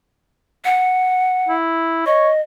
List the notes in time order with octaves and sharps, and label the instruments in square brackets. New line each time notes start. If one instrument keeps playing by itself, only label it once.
[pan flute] F#5
[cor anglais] E4
[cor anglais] C#5 [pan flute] D#5